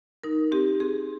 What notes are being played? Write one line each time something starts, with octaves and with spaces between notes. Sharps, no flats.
D#4 A#4
C4 G4
C4 G#4